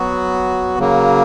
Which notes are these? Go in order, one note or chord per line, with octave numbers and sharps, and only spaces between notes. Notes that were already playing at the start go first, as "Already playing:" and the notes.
Already playing: F#3 B3 F#4
C#3 F#3 A#3